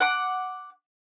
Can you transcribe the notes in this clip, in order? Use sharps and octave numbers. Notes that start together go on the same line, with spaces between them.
F#5 D6